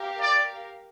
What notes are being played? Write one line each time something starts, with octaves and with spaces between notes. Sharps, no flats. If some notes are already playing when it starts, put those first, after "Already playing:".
Already playing: G4 A#4 F5
D5